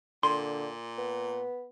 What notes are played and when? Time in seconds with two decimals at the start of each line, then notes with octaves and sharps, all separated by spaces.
0.23 A#2 D3 C6
0.98 B3